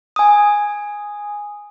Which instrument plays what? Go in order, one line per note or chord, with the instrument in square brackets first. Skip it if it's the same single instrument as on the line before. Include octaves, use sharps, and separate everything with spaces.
[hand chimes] G#5 D#6